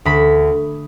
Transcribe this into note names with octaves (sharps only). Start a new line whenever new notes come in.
D2 B5